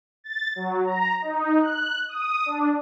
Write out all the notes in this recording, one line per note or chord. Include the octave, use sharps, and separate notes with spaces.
A6
F#3
A#5
D#4
F#6
D#6
D4